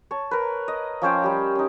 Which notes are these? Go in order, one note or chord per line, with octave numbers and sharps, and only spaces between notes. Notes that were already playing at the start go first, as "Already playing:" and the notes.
C#5 A5
A#4 B4
D#5
F3 C#4 C5 G5
G3 G4
C#4 D#4